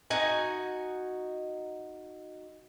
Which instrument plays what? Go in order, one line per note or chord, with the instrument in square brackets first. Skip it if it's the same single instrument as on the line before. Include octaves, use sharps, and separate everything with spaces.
[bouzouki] D#4 F#4 G#5